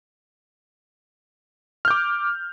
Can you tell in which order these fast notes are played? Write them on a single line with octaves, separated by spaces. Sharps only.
F6 G6 D6